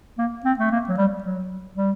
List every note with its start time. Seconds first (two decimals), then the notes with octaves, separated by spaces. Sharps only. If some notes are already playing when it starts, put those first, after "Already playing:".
0.18 A#3
0.45 C4
0.59 A3
0.71 A#3
0.88 F#3
0.97 G3
1.23 F#3
1.76 G3